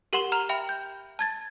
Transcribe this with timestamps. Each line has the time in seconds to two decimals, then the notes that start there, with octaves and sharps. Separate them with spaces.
0.13 G4 A#4 F#5 C6 E7 G7
0.32 A#5 F6 E7 F7
0.49 E5 G5 B5
0.69 G6
1.19 A5 G#6 A6